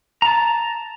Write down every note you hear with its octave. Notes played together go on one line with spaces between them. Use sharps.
A5 A#5